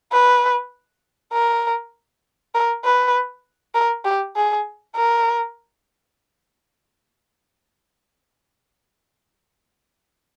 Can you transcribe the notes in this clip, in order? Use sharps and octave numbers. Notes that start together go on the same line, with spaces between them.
B4
A#4
A#4
B4
A#4
G4
G#4
A#4